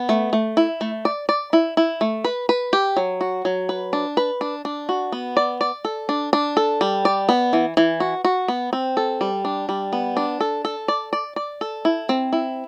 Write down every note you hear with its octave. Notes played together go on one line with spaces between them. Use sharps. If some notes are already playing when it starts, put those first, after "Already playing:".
Already playing: B3
A3
A3
E4
A3
D5
D5
E4
E4
A3
B4
B4
G4
F#3
F#4
F#3
B4
D4
B4
D4
D4
F#4
B3
D5
D5
A4
D4
D4
A4
G3
D5
B3
E3
E3
F#4
F#4
B3
C4
A4
G3
D4
G3
B3
D4
A4
A4
D5
D5
D5
A4
E4
C4
E4